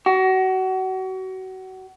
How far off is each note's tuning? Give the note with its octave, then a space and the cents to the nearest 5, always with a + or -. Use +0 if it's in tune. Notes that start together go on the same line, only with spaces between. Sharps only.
F#4 +30